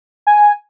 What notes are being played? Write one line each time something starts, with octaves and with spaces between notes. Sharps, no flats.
G#5